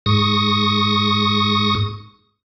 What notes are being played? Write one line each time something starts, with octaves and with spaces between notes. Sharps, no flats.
G#2 C#6 D#6 A#6